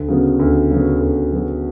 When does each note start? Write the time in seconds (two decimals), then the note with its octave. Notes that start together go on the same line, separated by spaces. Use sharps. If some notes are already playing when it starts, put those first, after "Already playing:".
Already playing: D2
0.08 C#3 F#3 B3
0.39 D2
0.71 C#3 F#3 B3
1.00 D2
1.32 C#3 F#3 B3